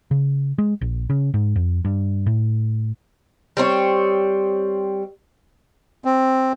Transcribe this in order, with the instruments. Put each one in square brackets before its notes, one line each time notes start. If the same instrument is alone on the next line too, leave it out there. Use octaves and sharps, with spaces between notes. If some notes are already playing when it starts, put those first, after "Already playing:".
[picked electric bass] C#3
G#3
A#1
C#3
G#2
F2
G2
A2
[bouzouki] G3 C4 D#4 C#5
[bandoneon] C4